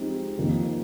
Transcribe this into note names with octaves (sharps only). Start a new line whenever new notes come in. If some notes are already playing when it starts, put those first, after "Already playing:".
Already playing: F3 G#3 C4 D#4 G4
F2 D#3 A#3